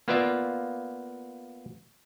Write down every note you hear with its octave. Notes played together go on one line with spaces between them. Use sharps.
A#3 B3 F4 D5 E5